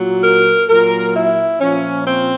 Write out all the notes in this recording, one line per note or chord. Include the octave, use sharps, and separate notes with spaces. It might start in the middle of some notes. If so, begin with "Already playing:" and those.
Already playing: A#2 F#3
A#4
A#2 F#3 A#4
E4
A#2 F3 C#4
C4